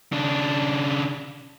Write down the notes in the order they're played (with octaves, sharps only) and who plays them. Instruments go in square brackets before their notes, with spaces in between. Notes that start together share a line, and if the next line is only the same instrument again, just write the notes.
[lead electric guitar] C#3 D4